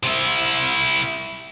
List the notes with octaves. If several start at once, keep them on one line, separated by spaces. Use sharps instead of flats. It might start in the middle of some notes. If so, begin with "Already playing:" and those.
C3 E4